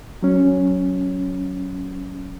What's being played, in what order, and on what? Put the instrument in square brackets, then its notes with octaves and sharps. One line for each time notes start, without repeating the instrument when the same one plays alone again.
[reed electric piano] F#3 C#4